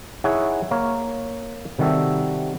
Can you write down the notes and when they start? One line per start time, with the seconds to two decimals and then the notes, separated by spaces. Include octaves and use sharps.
0.24 D#4 E4 G#4 C#5 F#5
0.71 A#3 A#4 C#5
1.79 C3 D#3 G3 F#4 A4 E5